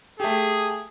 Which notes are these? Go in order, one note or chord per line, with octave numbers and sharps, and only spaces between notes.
A3 G4 G#4